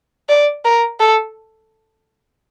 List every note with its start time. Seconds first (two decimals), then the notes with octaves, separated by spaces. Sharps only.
0.29 D5
0.64 A#4
1.00 A4